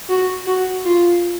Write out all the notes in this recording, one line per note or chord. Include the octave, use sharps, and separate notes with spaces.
F#4
F#4
F4